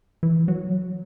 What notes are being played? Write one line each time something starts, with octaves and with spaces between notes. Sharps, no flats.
E3
F#3